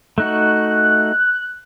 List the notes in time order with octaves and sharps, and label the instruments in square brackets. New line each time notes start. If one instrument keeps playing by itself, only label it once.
[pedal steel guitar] A3 D#4 F#4 [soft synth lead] F#6